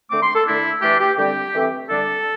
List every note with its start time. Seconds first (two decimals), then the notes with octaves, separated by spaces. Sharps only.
0.10 D3 A3 C4 D6
0.22 C6
0.34 A4
0.45 D3 A3 D4 E4
0.82 E3 A3 D4 G4
0.99 G4
1.17 D3 G3 C4 G4
1.53 E3 A3 C4
1.89 D3 G3 D4 A4